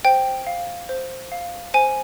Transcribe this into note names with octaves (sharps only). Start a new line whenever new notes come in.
C5 G5
F5
C5
F5
C5 G#5